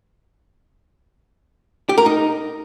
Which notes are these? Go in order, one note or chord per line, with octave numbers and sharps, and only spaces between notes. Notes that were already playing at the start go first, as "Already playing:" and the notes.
G4
A#4
D#4